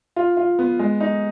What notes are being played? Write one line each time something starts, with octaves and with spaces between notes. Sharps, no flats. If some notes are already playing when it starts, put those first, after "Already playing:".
F4
F4
B3
G#3
D#4